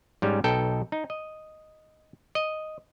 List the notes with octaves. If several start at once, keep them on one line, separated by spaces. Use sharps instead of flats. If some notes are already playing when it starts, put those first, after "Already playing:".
G#2 G3 C#4
B1 B2 D#4 A4 G5
D#4
D#5
D#5